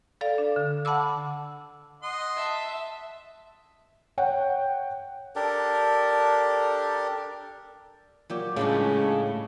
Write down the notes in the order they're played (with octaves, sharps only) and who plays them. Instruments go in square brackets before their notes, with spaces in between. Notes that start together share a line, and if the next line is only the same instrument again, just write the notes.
[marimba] A4 D5 F5
D4
D3
F#5 A5 B5 D6 E6
[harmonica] D#5 F#5 C6
[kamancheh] E5 A5
[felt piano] C#5 F#5 G5
[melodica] D4 G4 A4 A#4
[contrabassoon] A#2 [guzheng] F#3 G4
[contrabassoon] C#2 [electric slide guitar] A2 [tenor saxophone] C#3 [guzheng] G3 G#3 D4